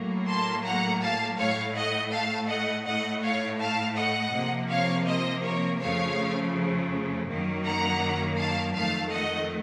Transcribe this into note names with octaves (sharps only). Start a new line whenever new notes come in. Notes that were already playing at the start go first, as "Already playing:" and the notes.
Already playing: A2 F#3 A#3
A5 C6
F#5 A#5
F5 A5
A2 A3 C#5 F5
D#5 F#5
F5 A5
D#5 F#5
A2 A3 D#5 F#5
C#5 F5
F5 A5
D#5 F#5
C3 F3 A#3
C#5 F5
C5 D#5
A#4 C#5
F2 C#3 F3 A3 C#5 F5
F#2 D#3 F#3 A#3
F#5 A#5
F5 A5
F2 D#3 A3 F5 A5
D#5 F#5